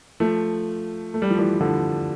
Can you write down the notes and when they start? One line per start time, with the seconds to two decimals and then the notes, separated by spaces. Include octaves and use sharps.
0.20 F3 A3
1.14 A3
1.22 G3
1.30 F3
1.38 E3 G3
1.53 E3
1.61 D3 F3